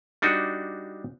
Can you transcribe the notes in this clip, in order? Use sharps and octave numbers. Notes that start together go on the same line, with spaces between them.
G3 D4 D#4 F#4